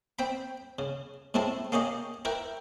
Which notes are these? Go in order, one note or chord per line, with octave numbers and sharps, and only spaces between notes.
C4 G5 B5
C#3
A2 G#3 C4 E4 A5
A#3 C#4 G4 G#4 D#5
E4 A#4 B4 G5